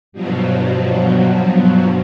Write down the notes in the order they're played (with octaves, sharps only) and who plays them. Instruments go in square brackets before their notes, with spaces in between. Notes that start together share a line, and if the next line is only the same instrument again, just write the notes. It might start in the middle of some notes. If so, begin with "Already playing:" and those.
[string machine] G2 B2 F3 F#3